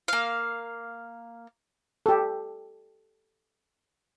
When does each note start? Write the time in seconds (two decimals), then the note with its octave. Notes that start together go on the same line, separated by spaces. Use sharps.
0.08 A#3 F5
2.06 G4 A4